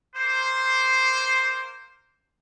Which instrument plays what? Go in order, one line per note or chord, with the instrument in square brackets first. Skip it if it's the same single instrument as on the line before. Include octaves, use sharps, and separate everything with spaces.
[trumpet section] A#3 C5